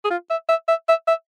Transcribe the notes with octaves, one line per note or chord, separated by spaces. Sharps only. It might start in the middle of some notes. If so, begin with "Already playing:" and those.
G#4
F4
E5
E5
E5
E5
E5